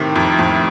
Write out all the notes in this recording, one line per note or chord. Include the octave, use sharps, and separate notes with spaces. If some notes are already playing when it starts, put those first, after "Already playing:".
Already playing: A2 C3 D#3 G4
F2
F2